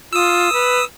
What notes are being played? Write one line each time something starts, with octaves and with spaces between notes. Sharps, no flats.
F4 D#6 E6
B4